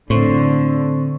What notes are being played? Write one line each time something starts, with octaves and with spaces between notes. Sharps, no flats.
A2 D3 C4 C5 C#6